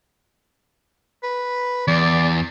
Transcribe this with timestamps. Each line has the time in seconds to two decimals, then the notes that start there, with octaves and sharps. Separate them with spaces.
1.23 B4
1.88 E2 D5